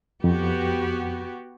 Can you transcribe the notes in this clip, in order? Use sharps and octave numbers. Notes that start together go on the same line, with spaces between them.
F2 B3 F#4 G4